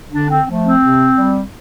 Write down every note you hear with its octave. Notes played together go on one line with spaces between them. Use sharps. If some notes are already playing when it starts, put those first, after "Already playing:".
D3 D4
C4
F3 A3
C4
C3
G3